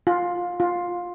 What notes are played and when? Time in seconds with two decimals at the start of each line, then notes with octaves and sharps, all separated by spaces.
0.07 F4
0.60 F4